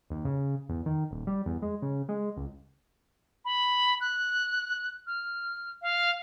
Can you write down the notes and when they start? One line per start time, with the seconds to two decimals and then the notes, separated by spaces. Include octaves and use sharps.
0.10 D#2
0.25 C#3
0.69 E2
0.86 D#3
1.11 D#1
1.27 G3
1.46 E2
1.62 G#3
1.82 C#3
2.09 G#3
2.37 C#2
3.45 B5
4.00 F#6
5.06 F6
5.82 F5